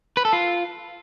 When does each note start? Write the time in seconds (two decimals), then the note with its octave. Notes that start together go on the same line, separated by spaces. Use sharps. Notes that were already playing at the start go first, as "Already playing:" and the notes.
0.17 B4
0.25 A4
0.33 F4